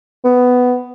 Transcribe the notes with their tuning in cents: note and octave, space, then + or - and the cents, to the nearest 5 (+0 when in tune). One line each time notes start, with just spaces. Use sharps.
B3 +10